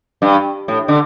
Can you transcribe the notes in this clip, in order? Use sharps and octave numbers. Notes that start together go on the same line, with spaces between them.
G2
A2
D3